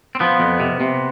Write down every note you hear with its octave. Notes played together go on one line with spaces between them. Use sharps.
C4
F3 B3
F2
C3
C3